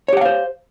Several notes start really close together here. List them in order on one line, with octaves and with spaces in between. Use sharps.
C#5 G4 F#5 F5 C5